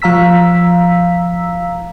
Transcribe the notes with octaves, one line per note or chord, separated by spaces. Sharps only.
F3 F5 A#5 E6 B6